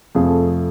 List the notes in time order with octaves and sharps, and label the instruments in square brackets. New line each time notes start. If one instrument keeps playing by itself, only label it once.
[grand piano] F2 C3 F3 A3 G#4